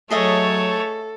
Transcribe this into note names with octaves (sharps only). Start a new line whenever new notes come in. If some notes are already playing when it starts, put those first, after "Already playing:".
F#3 A3 G#4 A4 C#5 D#5 E5